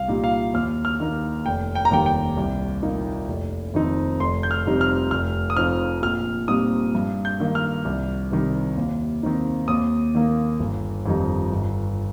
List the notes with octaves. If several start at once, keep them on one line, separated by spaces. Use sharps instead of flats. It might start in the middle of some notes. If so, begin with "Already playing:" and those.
Already playing: C2 F5
A#2 G3 D#4
F5
D#2 F6
F6
D#3 A#3 D#4
F1 G5
G5
A#5
D#2 D#3 G3 A#3 G5
G5
C2
A#2 A#3 D#4
F1
F2 D#3 C4 D#4
F1 C6
G6
F6
F2 C3 G3 D#4
F6
F1 F6
D#6
F2 F3 C4 D#4 F6
A#1 F6
A#2 G3 C4 D#4 D#6
G2
G6
D#3 A#3 D#4
F6
C2
C3 D#3 G3
D#2
D#3 C4 D#4
D#2 D#6
D#3 A#3
G1
F2 D#3 G3 D#4
G1